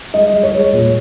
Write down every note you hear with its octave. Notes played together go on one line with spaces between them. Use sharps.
G#3 D#5
G#3
C#5
G#3
A#2